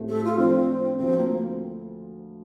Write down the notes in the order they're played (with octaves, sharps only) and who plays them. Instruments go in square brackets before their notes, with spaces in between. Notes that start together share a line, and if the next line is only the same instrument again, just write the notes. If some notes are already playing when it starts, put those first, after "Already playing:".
Already playing: [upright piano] A2 A3 C4 G4
[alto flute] A4
F4
[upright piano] F3 A3 D4 [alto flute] C4
[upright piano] D2 D3 F3 [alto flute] C4
[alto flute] A#3